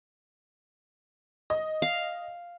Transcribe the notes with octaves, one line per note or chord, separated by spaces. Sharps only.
D#5
F5